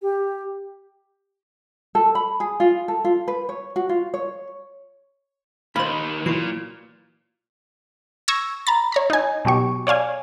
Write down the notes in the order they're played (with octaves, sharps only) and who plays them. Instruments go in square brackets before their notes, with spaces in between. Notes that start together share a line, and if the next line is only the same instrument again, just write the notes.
[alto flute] G4
[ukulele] A4
B5
G#4
F4
A4
F4
B4
C#5
F#4
F4
C#5
[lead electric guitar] D#2 D#3 [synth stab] C5 F5 [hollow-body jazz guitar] B5
[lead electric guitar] A#2 [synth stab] E3 F#3 C6
[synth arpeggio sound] C#6 E6 G#6 A#6
A#5 B5 A6
C#5 A#5 B5
D#4 G#5
B2 F#3 G4 C#6
C#5 D5 F5 G#5